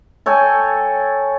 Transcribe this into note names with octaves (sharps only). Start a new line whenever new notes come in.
A4 C#5 G5 G#5